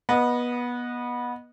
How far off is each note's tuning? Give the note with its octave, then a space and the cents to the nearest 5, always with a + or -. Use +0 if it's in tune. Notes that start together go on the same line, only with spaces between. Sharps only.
B3 -20 D#5 -5